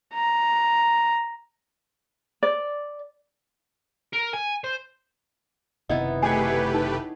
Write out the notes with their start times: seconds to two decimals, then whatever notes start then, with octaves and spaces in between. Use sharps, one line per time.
0.14 A#5
2.43 D5
4.13 A#4
4.34 G#5
4.64 C5
5.90 F#1 C3 D#3 B3 D#4 E4 D#5
6.22 A3 G4 G#4 B4 C#5 G#5
6.74 D#4